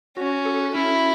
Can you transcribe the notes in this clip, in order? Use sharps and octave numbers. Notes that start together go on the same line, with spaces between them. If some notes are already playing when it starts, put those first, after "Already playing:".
C#4 F#4
A4
C#4 E4